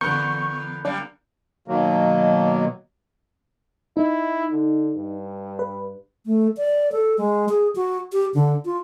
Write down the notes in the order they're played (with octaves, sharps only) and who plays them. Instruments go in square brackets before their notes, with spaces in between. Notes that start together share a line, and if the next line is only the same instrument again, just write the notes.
[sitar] E2 A#4 [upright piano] D3 B3 [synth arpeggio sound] C#6 [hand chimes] G6
[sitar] F#2 G3 A#3 [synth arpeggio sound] D4
[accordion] B2 D#3 F#3 A#3
[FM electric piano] D#4 [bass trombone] E4
[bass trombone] D3
G2
[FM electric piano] B4
[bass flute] A3
D5
A4
G#3
G#4
F#4
G4
D3
F4